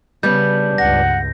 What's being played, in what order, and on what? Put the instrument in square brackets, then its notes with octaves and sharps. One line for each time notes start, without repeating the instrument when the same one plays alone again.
[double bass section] C#3 [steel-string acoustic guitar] G3 B3 D4 [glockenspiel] G6
[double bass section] C#2 G2 [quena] F#5 [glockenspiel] A#6